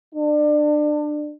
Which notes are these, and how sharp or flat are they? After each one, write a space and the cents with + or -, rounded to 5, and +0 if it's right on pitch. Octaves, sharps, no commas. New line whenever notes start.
D4 +25